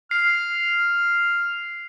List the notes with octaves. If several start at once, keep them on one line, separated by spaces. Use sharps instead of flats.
F6 C7